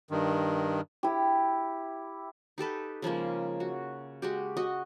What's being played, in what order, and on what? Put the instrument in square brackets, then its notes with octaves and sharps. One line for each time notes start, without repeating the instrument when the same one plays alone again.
[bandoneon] G2 D#3
[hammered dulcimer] E4 G4
[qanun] D#4 G4 A4 B4
C#3 F3 G#3 A#3
F#4
G#3 F#4 G4
F#4 D#5